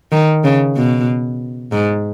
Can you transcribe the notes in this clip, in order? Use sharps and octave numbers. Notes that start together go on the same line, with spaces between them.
D#3
C#3
B2
G#2